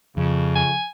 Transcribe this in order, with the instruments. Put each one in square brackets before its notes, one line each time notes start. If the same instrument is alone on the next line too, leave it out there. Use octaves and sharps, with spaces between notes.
[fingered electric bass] F2 [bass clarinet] C#3
[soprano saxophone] G#5